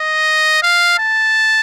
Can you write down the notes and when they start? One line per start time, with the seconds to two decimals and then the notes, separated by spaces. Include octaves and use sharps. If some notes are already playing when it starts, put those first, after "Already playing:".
Already playing: D#5
0.62 F5
0.99 A5